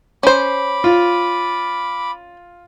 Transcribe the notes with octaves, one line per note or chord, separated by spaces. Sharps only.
C#4 C5 B5 D6
F4